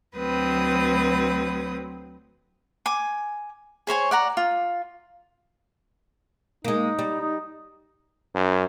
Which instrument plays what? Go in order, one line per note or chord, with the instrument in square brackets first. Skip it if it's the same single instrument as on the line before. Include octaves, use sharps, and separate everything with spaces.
[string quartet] D2 F#3 C4 B4 D#6
[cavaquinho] G#5 D6
G#4 C5 C#5 G#5
D5 F#5 A#5
F4
[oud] G#3 A#3 [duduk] D#4
[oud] G3
[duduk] D#4
[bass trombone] F#2